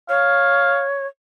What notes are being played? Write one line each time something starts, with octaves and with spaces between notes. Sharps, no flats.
C#5 F5